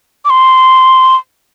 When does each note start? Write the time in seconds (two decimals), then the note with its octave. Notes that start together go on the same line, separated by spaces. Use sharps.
0.25 D6
0.30 C6